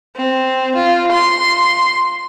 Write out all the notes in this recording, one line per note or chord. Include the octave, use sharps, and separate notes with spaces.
C4
F4
C6